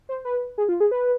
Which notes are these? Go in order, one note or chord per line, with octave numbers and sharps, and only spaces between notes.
C5
B4
G#4
F4
G#4
B4